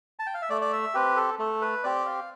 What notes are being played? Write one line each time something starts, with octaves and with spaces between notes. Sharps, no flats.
A5
G5
F5
E5
A3 D5
D5
E5
C4 G4 B4
A4
A3 A4
B4
C4 G4 D5
F5